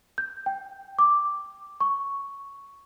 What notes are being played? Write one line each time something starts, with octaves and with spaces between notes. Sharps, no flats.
G6
G5
D6
C#6